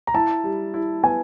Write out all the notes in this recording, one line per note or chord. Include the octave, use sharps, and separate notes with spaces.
A#5
E4 A5
G3
E4
B3 G#5